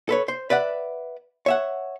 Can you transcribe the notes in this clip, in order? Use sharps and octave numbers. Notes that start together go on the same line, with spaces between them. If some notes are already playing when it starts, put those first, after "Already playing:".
A4 B4 C#5
C5
B4 D5 E5 F#5
C#5 E5 F#5